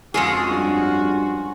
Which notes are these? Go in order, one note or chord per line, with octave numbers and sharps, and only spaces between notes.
F2 G#3 C#4 F4 F#4 G#4
G2 G#5